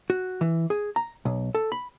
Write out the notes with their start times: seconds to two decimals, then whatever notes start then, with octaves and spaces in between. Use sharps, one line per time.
0.10 F#4
0.41 E3
0.70 G#4
0.96 A#5
1.25 B1
1.55 A4
1.72 B5